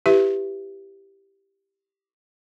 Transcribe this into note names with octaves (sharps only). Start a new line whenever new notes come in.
E4 G4 B4 E5